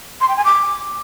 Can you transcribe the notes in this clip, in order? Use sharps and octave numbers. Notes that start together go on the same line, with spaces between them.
C6
G5
G#5
D6